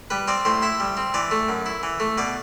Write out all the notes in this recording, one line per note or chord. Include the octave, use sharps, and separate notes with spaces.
G3 B4
C4 D5
A2 C5
E4 E5
G3
C4
E3 D5
A3
F#2
E4
E3
A3
B2 D5